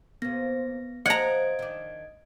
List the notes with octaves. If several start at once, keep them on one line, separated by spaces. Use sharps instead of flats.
C3 A#3 B3 A#6
F3 D#5 F#5 A#5 G#6 D7
D#3 D4